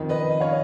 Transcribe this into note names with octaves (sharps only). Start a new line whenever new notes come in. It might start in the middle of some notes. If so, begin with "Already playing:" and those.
Already playing: F2 D#3
B4 D#5
C#5 F5